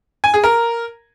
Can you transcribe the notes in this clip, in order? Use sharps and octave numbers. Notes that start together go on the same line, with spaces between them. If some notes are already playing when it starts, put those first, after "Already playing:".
G#5
G#4
A#4